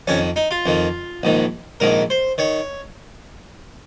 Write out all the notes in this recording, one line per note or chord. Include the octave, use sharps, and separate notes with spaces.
F2 D#3 C#4
D#4
F4
F2 D#3
A#1 G#2 D#3
A#1 G#2 D#3 A#4
C5
D#3 C#5